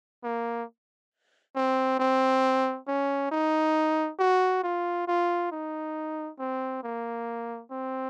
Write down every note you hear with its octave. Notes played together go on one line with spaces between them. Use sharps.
A#3
C4
C4
C#4
D#4
F#4
F4
F4
D#4
C4
A#3
C4